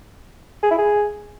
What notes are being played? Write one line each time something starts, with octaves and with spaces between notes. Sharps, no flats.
G#4
E4
G#4